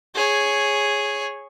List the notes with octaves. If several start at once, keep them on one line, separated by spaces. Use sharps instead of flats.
G#4 C#5